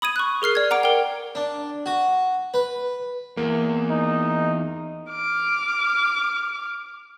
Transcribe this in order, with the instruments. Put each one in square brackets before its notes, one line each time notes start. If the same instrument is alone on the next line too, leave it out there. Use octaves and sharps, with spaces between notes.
[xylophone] B5 D#6 G#6 D#7
C#6 F#6
G#4 A#4 F6 C7
D5 G#6
F#5 A#5 D6 D7
A#4 G5
[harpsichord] D4
F#4
B4
[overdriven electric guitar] E2 [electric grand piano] A#3
[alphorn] D#4
[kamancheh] D6 F6